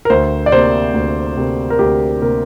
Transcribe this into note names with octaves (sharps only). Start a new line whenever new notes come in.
A#4
D2 C5
D5
C3 A#3 C5
D2
C3 A#3
A#4
D2 G4
C3 A#3 A#4